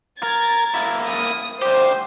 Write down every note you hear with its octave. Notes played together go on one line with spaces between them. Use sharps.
A#4 G#6 A6
A#3 E4
D#6
D2 G4 C5